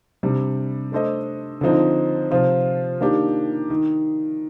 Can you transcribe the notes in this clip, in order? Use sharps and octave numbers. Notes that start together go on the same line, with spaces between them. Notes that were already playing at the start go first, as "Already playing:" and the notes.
C3 G3 D4
A3 D4 A4 C5 D#5
D3 F3 C4 D#4
C3 F3 C4 F4
D#3 A#3 D4 G4
D#3